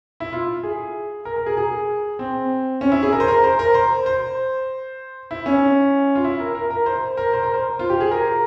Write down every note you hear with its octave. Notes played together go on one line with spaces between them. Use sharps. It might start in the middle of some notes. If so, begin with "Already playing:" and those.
E4
F4
G#4
A#4
A#4
G#4
G#4
C4
C#4
E4
G#4
A#4
C5
A#4
C5
A#4
C5
C5
E4
C#4
F4
E4
A#4
A#4
A#4
C5
A#4
C5
A#4
C5
F4
G4
G#4
A#4